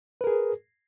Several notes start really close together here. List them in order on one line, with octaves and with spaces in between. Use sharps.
B4 A#4 G#4